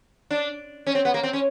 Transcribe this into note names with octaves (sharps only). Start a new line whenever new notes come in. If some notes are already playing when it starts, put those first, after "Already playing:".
D4
C#4
C4
B3
A#3
C4
C#4